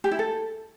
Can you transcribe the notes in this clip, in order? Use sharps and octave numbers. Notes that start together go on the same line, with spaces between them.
G4
E4
A4